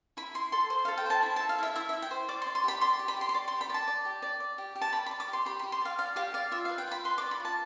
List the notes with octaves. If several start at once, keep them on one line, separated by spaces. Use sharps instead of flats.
E4 B5
E4 C6
A4 C6
C5 C6
A4 F5
G5
C5 A5
E4 B5
A5
A4
F5
E4 E5
E4 E5
E5
E4
G5
C5
D5 D6
C6
D5
C6
G4 B5
D5 C6
G4
B5
G4 C6
C6
D5 D6
C6
G4
B5
D5 A5
D5
G4
D5
D5
G4
G4
A5
D5 B5
B5
D5
D6
G4
C6
G4 B5
B5
G4
C6
D5 F5
D5 F5
G4 F5
D5 F5
F4 E5
F5
B4
G5
F4 B5
B4 C6
D6
D5
B5
F4
A5